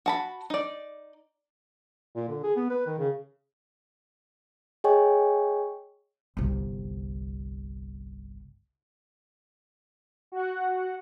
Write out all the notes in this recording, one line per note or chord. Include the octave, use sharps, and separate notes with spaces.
F#4 A5 B5
D#4 D5
A#2
D3
G#4
B3
B4
D#3
C#3
G#4 C#5 D#5 G5 G#5 C#6
G1 C2
F#4 F#5